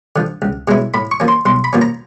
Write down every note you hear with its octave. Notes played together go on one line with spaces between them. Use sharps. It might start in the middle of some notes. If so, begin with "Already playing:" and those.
D3 F3
C#2
B2 G#3 C#4 E4
A2 B5
C#6
F3 A#3 C#4
C6
B1 C6
B5
A#2 F3 A#3 C#4
A#5